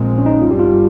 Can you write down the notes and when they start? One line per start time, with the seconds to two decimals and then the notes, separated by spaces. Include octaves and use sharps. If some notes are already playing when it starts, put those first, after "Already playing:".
Already playing: A#1 A#2 G#3 C4
0.18 C#4
0.26 D#4
0.42 F4
0.50 G1 G2 G3 G4
0.59 F4